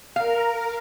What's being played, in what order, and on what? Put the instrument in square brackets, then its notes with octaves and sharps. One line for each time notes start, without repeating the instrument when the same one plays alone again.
[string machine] A#4 [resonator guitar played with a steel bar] F5